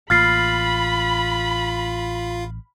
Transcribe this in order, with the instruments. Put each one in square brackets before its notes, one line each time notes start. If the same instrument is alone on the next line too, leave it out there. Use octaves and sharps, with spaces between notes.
[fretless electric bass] A1 A#3 [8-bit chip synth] F4 F5 [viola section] B5 [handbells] F6 A6 C7